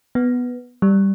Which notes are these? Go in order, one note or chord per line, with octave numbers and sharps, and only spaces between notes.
B3
G3